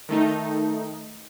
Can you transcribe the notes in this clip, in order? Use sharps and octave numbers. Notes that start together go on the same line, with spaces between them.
D#3 A3 D#4